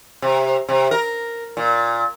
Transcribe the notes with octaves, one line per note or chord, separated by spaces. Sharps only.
C3
C3
A#4
A#2